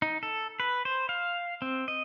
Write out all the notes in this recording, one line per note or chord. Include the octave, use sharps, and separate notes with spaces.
D#4
A4
B4
C5
F5
C4
D#5